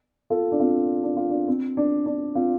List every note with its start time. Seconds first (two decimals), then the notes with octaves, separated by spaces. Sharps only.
0.30 F4 A4
0.52 D4
0.60 C4 F4
1.03 D4
1.17 F4
1.31 D4
1.48 C4
1.77 D4
2.06 D4
2.35 C4 F4